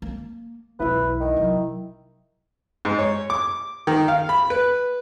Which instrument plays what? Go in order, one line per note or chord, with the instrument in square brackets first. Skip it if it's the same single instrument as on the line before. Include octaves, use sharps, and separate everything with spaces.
[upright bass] A#3
[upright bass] B1 E2 [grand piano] E4 [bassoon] B4
[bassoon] D#3
[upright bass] C3 F#3
[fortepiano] G#2
C#5
D6
D#3
F5
B5
B4